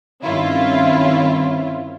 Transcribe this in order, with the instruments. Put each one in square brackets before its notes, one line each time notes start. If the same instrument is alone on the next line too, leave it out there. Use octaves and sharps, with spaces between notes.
[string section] G2 D#3 C4 C#4 E4 F4